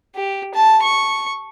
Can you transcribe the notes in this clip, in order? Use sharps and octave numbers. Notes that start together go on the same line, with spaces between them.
G4
A5
C#6